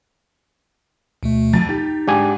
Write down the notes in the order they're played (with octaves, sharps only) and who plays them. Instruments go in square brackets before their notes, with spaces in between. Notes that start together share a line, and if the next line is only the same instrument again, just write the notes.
[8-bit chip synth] D2 B2 A3
[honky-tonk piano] F2 A6
[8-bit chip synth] D#4 [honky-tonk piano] G4
[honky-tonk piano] G#2 [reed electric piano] D4 G4 G#5